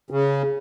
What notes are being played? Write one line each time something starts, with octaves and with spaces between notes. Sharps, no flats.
C#3